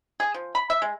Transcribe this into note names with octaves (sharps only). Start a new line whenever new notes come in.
G#4
F3
B5
E5
G#3